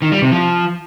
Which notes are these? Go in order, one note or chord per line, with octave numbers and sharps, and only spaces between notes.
D#3
G3
C3
F3